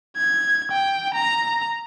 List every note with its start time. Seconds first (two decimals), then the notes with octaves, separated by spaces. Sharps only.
0.17 G#6
0.72 G5
1.14 A#5